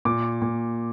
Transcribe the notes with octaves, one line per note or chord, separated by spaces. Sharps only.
A#2 D6
A#2